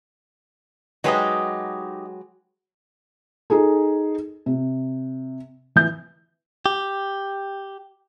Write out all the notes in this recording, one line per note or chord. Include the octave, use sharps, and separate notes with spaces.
F#3 G#3 D#4 G4 B4 D#5
D#4 G#4 A4
C3
E3 G6
G4